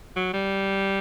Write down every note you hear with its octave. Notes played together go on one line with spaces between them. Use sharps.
F#3
G3